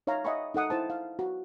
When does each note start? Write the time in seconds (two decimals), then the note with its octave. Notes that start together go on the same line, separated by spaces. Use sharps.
0.07 D#4 C#5 E5 F5 A#5
0.25 D#5 E5 F#5 G#5 B5 C#6
0.54 D#4 A4 F#5 D#6
0.70 E4 C5 A5
0.90 F5
1.19 F#4